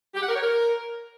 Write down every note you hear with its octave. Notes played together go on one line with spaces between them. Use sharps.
G4
F#5
A#4
C#5
A#4